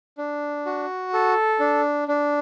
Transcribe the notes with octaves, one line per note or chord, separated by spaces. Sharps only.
D4
F#4
A4
D4
D4